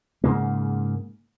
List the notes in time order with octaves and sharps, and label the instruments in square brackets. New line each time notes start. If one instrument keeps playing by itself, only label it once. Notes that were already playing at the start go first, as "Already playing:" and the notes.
[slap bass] G#2 C#3 A#3